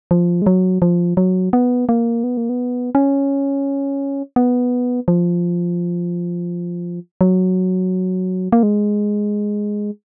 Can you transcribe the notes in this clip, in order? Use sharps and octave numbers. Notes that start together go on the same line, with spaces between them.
F3
G#3
F#3
F3
F#3
B3
A#3
B3
A#3
B3
C#4
B3
F3
F#3
A#3
G#3